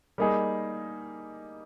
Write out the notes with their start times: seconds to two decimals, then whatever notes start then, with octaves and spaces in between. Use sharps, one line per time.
0.18 G3 A#3 D#4 G#4